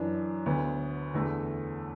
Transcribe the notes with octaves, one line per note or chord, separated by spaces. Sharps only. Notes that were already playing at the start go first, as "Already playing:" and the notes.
Already playing: F#2 E3 D4
D2 D3 B3
E2 D3 A3